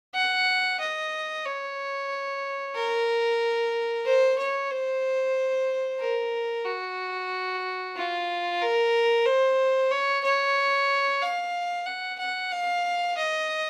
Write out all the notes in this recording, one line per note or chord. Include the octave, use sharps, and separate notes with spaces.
F#5
D#5
C#5
A#4
C5
C#5
C5
A#4
F#4
F4
A#4
C5
C#5
C#5
F5
F#5
F#5
F5
D#5